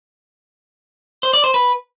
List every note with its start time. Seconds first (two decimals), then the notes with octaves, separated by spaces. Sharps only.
1.23 C5
1.33 D5
1.44 C5
1.54 B4